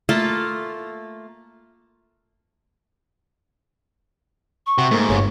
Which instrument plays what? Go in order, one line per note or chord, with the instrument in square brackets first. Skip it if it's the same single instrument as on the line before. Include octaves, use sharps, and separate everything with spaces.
[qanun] A3 A#3 F4 A4
[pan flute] C#6
[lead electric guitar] C3 [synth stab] F#4
[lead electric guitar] G#2 [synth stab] A3 A#3
[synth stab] G1 G2 [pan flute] C#5